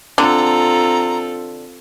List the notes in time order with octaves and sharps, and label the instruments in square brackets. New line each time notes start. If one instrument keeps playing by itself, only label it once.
[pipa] D3 [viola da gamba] C4 F4 A4 [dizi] A#5